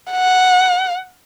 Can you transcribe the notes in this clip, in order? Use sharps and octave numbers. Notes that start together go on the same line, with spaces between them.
F#5